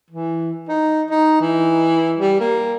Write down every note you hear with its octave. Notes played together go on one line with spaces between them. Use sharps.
E3
D#4
D#4
E3
G3
A#3